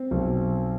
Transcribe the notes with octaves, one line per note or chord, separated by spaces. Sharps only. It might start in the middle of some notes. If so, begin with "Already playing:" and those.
Already playing: C4
B1